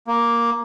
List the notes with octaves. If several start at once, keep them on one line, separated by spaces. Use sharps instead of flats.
A#3